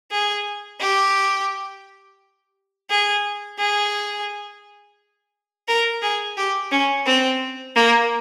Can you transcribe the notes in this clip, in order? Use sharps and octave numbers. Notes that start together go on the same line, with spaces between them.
G#4
G4
G#4
G#4
A#4
G#4
G4
C#4
C4
A#3